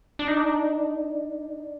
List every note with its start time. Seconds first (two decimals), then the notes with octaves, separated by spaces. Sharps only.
0.19 D4
0.28 D#4
0.37 D4
0.45 D#4
0.54 D4
0.63 D#4
0.71 D4
0.80 D#4
0.89 D4
0.97 D#4
1.06 D4
1.14 D#4
1.23 D4
1.32 D#4
1.41 D4
1.50 D#4
1.58 D4